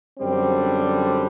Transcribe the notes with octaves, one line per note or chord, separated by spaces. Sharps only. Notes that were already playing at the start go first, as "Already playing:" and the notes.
F#2 D3 G3 C4